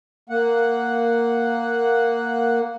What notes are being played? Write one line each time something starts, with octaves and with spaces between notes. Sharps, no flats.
A#3 F#5